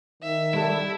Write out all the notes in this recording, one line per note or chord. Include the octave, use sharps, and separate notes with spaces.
D#3 E5
G3 E4 A4